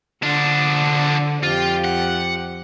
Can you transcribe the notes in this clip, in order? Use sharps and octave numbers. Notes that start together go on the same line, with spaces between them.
D3 F3 D4
F2 F4 G4
F#5